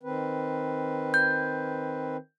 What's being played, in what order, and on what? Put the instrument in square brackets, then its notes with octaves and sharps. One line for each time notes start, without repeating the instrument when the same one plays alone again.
[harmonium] D#3 C4 B4
[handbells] G6